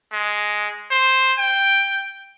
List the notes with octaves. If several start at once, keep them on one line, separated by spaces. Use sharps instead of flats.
G#3
C5
G5